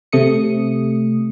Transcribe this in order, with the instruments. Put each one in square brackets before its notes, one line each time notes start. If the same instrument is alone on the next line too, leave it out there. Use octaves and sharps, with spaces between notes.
[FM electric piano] C3 A3 D#6 C#7